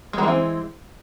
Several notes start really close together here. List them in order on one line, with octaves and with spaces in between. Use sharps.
G#3 F#3 E3 C4